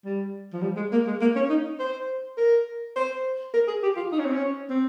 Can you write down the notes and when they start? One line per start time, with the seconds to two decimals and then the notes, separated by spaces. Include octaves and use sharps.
0.05 G3
0.53 F3
0.62 G3
0.77 G#3
0.92 A#3
1.07 G#3
1.21 A#3
1.36 C#4
1.50 D#4
1.79 C5
2.38 A#4
2.96 C5
3.54 A#4
3.68 G#4
3.83 G4
3.97 F4
4.12 D#4
4.19 C#4
4.26 C4
4.33 C#4
4.70 C4